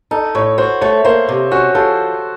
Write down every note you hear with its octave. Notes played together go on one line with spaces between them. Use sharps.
D#4 A4
A2 C#5
F#4 C5
A3 C#5
A#3 C5
C3
C#4 F#4
F3 A4